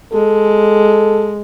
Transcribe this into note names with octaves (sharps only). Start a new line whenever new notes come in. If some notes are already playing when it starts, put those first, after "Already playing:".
G#3 A4